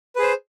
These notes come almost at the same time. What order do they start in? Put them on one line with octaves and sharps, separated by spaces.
B4 G#4 C5